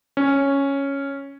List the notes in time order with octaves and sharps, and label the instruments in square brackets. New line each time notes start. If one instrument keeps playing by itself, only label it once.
[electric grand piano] C#4